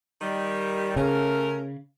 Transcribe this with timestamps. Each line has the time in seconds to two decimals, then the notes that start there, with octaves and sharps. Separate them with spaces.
0.21 D#3 G3
0.96 C#3 A3 C#4 A#4